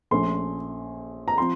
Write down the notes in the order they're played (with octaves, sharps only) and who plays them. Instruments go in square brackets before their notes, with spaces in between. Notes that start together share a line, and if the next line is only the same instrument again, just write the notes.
[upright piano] A#1 A#2 A3 C#4 C6
A#5
F3 C4 C6